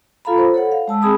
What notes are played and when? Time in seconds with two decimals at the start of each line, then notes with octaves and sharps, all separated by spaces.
0.25 F4 A4 F5 A#5 B5
0.38 C5
0.54 A4 C#5 F#5
0.72 F5
0.88 G#3 A5 E6
1.02 C4 G#4 G#5 B5 D#6